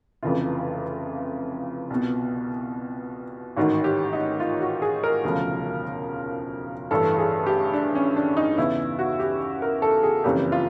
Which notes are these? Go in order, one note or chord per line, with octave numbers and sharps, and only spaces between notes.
F1 F2 C#3 E3 F4
C2 B2
A1 G#2 D#3 F#4
G4
D#4
F4
F#4
G#4
A#4
E1 D2 C#3 F3
A1 G2 E3 A4
G#4
G4
D4
C#4
D4
D#4
E2 C#3 E3 E4
F#4
G4
A#4
A4
G#4
F#1 F2 C#3 E3 G4
F4